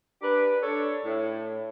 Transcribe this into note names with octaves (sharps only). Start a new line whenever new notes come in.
D4 G4 A#4 B4
D4 A4 C#5
A2